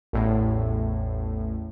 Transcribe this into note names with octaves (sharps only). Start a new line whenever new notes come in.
A1 E2 A2